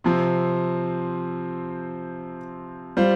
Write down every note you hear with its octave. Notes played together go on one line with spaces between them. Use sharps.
C3 F3 C4
G3 F4 C5